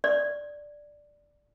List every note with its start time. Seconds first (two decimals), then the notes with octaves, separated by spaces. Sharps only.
0.04 D5